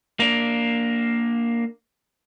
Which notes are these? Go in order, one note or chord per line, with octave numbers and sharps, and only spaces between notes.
A#3 D4